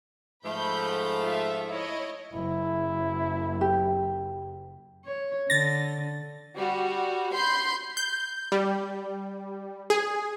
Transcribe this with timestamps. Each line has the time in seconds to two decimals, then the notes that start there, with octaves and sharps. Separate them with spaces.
0.45 G#2 F3 A3 B5 G6
1.24 F4 E5
1.67 E4 C#5 D#5
2.34 F#1 E4
3.61 G4
5.05 C#5
5.50 D3 A6 A#6
6.55 G3 F#4
7.33 B5 C6 G6 C7
7.97 G6
8.52 G3
9.90 G#4